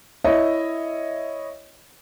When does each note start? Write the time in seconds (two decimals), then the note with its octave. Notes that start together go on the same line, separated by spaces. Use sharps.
0.24 E4 C#5 D#5 E5